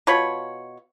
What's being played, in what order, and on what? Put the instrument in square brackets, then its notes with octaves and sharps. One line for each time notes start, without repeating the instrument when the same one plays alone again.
[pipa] B2 F4 C#5 B5